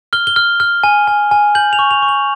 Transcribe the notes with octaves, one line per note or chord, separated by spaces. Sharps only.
F6 G7
G7
F6
F6
G#5
G#5
G#5
G6 F#7
F7
C#6
F7
C#6
F#7